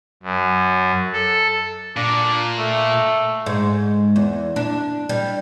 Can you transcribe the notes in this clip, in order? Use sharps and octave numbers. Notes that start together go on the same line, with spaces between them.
F#2
A4
A#2 D4
A3
G#2
E2
D4
G3